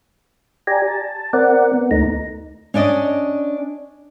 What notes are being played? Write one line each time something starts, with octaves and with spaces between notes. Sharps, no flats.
G4 D5 G#5 A#5
A5
C4 A#4 D5 F#5
B3
D2 A3 D#4 A#5
C#4 D4 D5 D#5